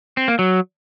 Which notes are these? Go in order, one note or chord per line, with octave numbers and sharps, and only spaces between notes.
C4
A#3
F#3